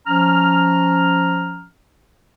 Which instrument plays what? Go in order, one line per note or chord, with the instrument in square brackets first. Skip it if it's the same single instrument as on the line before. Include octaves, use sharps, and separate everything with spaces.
[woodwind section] F3 C#4 A#5 F6